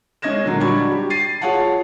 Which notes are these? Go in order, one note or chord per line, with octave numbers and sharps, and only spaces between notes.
G#3 C#4 D#5 G#6 A#6 E7
A#2 D3 F#3
G3 D4 F#4 B5 C#6 G#6
G4
A6 C7 D#7
F4 G#4 C#5 F5 F#5 A5